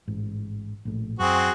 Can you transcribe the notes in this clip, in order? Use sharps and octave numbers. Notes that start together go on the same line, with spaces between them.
A1 G#2
A#1 A2
F#2 C4 F#4 G#4